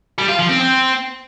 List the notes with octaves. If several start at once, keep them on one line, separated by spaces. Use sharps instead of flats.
G3
F4
F3
C4
C4